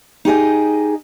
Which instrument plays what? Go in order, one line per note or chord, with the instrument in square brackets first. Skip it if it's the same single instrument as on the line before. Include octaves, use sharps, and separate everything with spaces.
[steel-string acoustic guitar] D#4 G4 G#4 D#5